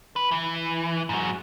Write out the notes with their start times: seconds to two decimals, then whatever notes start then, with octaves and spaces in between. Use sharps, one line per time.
0.16 B4
0.31 E3
1.09 G#2 F#3